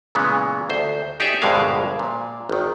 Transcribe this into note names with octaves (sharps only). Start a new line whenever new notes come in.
A#2 C#3 E3 G#3 B3
D2 C5
D#4 G4 G#4 C#5 D5 E5
A#1 G2 B2 D3 G#3 F5
A#2
G#1 D#3